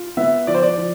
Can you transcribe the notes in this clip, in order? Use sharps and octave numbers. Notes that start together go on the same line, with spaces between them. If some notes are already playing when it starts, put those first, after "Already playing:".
Already playing: F4
B3 E5
F3 D5
C5
D5
F3